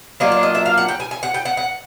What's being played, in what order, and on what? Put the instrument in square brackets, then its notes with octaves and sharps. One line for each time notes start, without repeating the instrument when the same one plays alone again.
[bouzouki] F#3 A#3 D4 F4 D#5
D5
D#5
E5
F5
F#5
G5
G#5
G#5
F#5
G5
F#5
F#5